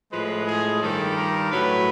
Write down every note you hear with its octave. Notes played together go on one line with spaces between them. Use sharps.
A2 F3 G#3 B4
G#4
G2 D#3 G3 A4
A#4
A2 F#3 B4